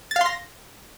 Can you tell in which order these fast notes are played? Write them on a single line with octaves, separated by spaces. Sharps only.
A6 F5 C6 A#6